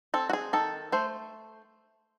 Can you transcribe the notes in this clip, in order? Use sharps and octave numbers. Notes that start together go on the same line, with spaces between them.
C4 A4
F#4
G#4
D#3 A4
A3 C5